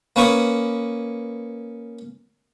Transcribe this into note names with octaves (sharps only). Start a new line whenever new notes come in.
A#3 C#4 B4 G#5 C#6 D#6